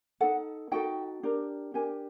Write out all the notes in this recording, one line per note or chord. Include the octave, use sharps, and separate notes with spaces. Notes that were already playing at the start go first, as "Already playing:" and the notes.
D#4 F#4 A4 F#5
D#4 F#4 A4 G5
D4 G4 A#4
D4 G4 A#4 G#5